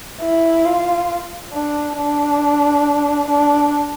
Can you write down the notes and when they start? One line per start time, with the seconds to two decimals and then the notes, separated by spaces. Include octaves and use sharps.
0.21 E4
0.65 F4
1.53 D4
1.97 D4
3.29 D4